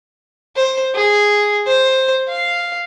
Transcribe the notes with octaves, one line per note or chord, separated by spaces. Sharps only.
C5
G#4
C5
F5